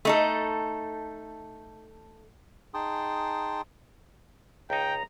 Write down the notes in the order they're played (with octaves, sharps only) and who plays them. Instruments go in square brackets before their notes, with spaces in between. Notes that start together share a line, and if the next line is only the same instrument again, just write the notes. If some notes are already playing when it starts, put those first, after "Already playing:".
[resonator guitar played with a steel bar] A3 D#4 A4
[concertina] D#4 G#4 G5 A5 C6 D#6
[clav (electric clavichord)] C#2 D#4 [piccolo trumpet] G5 [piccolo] A#5